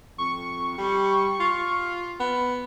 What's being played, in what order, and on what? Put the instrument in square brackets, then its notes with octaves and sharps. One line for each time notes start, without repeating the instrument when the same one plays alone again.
[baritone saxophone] F2 [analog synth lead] C#6
[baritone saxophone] G3
F4
B3